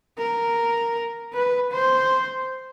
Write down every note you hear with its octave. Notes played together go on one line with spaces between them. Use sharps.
A#4
B4
C5